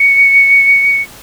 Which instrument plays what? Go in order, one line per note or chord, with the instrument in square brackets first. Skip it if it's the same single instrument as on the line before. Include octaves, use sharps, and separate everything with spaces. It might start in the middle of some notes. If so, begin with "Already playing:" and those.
Already playing: [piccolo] C#7